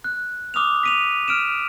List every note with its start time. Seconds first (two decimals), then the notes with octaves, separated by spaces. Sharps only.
0.04 F#6
0.54 D6 D#6 F6 F7
0.83 B6 D#7 F7
1.28 F6 D7 E7